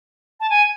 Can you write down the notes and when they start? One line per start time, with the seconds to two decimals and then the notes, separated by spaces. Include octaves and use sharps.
0.40 A5
0.50 G#5